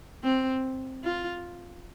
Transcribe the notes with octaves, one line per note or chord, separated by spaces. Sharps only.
C4
F4